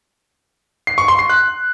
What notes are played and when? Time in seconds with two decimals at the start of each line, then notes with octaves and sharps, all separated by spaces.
0.87 C7
0.98 C#6
1.08 C6
1.19 C7
1.29 F#6